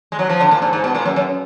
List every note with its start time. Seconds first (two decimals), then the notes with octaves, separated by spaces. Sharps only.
0.12 G#3
0.19 F#3
0.29 F3
0.41 D3
0.51 A#2
0.62 G#2
0.73 G#2
0.84 B2
0.95 A#2
1.05 F#2
1.16 F#2